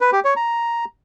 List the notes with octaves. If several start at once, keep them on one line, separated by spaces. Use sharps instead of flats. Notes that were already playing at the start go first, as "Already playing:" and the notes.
B4
G4
C#5
A#5